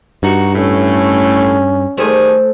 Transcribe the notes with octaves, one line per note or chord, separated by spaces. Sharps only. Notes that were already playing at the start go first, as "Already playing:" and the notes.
G2 D#4 F#4
A2 A3 C#4
D#3 G3 A3 G#4 C5